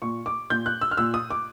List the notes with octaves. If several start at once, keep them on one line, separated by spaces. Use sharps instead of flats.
A#2 C#6
D6
A#2 G6
F#6
E6
F6
A#2 E6
D#6
D6